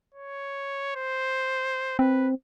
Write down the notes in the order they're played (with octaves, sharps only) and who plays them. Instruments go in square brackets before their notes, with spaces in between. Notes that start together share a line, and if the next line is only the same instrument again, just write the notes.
[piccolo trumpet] C#5
C5
[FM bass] C4 [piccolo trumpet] B4